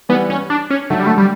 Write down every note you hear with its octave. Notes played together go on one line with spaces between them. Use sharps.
E3 G3 B3
C#4
D4
C#4
D3 F#3 A3
G3
A3
G3